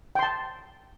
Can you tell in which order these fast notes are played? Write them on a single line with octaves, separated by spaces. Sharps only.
G5 C6 A5